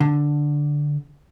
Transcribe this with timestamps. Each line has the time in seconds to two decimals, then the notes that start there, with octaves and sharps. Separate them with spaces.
0.01 D3